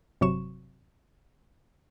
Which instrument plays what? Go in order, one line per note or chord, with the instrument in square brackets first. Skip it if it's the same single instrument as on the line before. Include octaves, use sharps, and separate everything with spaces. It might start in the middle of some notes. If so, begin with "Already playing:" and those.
[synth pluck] G1 C3 F#3 C#6 E7